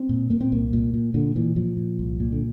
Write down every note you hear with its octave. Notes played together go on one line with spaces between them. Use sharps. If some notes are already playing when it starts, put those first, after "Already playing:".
Already playing: C4
A#2
A#2 A#3
C4
C2 A#3
A#2
A#2
A#2 D3
A#2 E3
A#2 F3
A#2
C2
A#2
D3